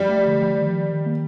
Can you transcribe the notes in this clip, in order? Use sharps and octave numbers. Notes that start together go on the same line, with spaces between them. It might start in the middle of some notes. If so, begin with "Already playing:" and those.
Already playing: F3 G3 D5
A3
D3
F3
D#3
D#3
D#3
A#3